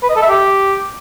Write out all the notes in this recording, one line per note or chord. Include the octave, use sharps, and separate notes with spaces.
B4
D#5
A4
E5
G4